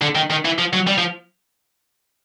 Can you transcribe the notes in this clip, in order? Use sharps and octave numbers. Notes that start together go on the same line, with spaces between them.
D3
D#3
D#3
E3
F3
F#3
G3
F3